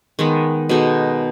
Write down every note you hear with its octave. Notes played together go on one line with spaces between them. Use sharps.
D#3 G#3 B3
B2 G#3 D#4 A4